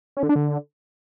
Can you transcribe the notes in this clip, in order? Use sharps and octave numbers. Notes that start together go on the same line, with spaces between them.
C#4
D3
D4
D3